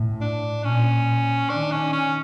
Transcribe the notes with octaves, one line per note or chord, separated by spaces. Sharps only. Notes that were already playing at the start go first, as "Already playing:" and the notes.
Already playing: A2
D4
A#2 C#4
D#3 D4
C#4
C#4